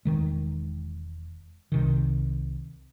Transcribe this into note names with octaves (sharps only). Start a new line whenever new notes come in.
E1 C2 D#3 G#3
C2 C3 D#3